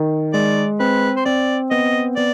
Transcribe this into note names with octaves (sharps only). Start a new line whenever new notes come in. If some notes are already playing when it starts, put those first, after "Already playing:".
Already playing: D#3
G#3 D5
C4 B4
C5
C4 D5
B3 D#5
B3 D5